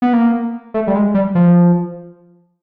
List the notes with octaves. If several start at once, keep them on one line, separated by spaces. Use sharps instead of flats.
B3
A#3
A3
G3
G#3
G3
F3